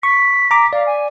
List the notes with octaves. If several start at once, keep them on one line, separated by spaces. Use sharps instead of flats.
C#6 B6
A#5 D6
D5 F5
G#5